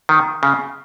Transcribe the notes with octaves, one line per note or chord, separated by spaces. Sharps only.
D#3
C#3